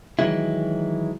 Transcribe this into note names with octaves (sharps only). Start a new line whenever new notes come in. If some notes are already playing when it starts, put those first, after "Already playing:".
D#3 E3 F#3 G#3 E4